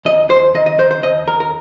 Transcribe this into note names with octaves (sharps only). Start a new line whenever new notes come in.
D#2 D#5
D#2 C5
D#3 D#5
D#5
D#3 C5
C5
D#2 D#5
D#2 A#4
A#4